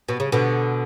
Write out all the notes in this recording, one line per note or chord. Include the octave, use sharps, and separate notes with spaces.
B2
C#3
B2 D3